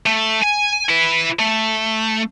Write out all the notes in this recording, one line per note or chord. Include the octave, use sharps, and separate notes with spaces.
A3
G#5
E4 B4
A3